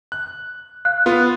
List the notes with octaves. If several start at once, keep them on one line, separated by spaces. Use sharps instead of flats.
F#6
F5 F#6
B3 F4 B4